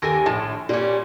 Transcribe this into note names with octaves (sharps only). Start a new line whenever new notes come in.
D#2 G4 A4 A#4 G#5 A#6
A#1 A2 A5
A#2 G3 C#4